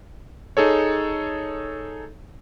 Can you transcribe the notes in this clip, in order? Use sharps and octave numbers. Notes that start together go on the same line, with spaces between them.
D#4 G#4 A4 C#5